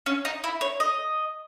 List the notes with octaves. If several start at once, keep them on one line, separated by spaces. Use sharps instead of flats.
C#4
D#4
E4
C#5
D#5